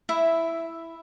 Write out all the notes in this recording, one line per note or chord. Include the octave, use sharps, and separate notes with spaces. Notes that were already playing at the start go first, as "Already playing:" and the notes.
E4 E5